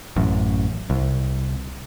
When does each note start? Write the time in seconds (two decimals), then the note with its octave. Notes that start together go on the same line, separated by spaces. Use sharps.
0.16 A1 F#2
0.90 C2